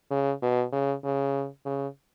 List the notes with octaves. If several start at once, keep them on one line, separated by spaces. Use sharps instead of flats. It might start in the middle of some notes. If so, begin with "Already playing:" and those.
C#3
B2
C#3
C#3
C#3